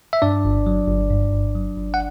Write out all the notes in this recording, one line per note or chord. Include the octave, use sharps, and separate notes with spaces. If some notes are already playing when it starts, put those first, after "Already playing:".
E5
G2 D4 D5
G1
F#3
G1
G2
G1
F#3
G1
F#5